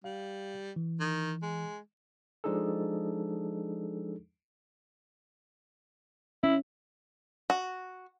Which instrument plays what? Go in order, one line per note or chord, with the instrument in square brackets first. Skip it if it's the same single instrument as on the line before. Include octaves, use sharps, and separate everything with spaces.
[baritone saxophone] G3 [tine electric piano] F5
[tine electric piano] E3
[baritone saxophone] D#3
G#3
[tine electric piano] F3 G#3 D4 D#4 G#4 A4
[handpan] C#4 [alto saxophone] E4
[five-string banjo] F#4